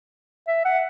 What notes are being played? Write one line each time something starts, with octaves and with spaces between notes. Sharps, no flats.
E5
F#5